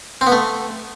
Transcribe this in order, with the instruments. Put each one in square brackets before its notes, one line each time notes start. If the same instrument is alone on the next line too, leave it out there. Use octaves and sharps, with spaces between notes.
[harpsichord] C4
B3
A3